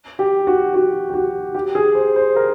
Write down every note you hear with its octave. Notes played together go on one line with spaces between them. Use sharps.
G4
F#4
F#4
G4
F#4
G4
G#4
C5
C5
A#4